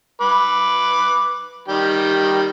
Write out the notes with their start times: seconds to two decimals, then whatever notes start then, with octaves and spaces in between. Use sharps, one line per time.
0.21 B4 D6
1.68 D#3 G3 G5